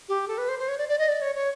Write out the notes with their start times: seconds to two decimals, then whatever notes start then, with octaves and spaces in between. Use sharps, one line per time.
0.09 G4
0.28 A4
0.38 B4
0.49 C5
0.59 C5
0.68 C#5
0.78 D5
0.89 D5
0.99 D#5
1.09 D5
1.22 C#5
1.35 C#5